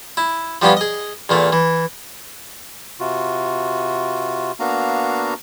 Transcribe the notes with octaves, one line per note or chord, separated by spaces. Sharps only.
E4
F3 G3 B3 C#4 F4
G#4 D#5
E2 A#2 A3
E3
C3 F4 F#4
A#3 B3 D4 F#4 F5 A#5